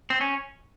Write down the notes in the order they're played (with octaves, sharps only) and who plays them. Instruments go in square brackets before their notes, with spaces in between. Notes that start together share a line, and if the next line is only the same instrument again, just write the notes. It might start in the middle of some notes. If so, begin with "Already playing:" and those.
[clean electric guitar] C4
C#4